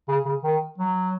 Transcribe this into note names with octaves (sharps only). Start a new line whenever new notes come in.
C#3
C#3
D#3
F#3